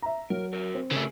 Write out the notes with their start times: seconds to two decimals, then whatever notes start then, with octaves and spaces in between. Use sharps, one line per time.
0.02 E5 A#5
0.30 F#3 A#4
0.53 F#4 A#4
0.74 C4
0.91 C#3 A3 G#4 A#4